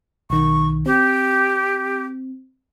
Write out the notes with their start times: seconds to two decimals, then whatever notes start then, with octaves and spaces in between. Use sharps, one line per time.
0.30 B1 D#3 C#6
0.86 C4 G4